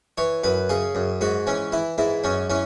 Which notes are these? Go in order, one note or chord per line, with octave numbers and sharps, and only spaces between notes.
E3 C#5
F#2 B4
C#3 G#4
F#2
G#2 F#4
E3 C#4
E3 E4
G#2 E4
F#2 C#4
E3 C#4